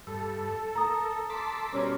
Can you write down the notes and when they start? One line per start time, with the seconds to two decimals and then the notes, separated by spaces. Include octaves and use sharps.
0.07 G2 A4
0.75 A#4 A#5 D#6
1.30 A4 A5 C6 D6 E6 B6
1.72 B2 G3 C#4 A#4 C5 D5